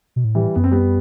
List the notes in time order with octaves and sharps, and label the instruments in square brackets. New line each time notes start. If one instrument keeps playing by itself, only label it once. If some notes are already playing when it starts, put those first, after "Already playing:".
[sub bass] B2
A2
[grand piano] E3 G3
[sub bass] F#2 [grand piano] B3
[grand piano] C4
G3 B3